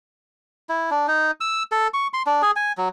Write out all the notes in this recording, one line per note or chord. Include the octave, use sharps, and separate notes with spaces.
E4
D4
D#4
E6
A4
C#6
C6
D4
G#4
G#5
F#3